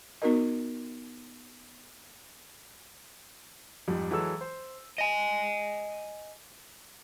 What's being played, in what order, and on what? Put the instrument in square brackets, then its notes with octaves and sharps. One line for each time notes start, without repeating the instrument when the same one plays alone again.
[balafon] B3 D#4 F#4 A#4 D#5
[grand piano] F2 G#2 G3
E3 F#3 G#3 A4 E6
C5
[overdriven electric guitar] D#5 G#5